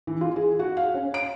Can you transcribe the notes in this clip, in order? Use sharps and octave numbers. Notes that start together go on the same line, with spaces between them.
E3
F4
G#4
F#4
F5
C#4
D7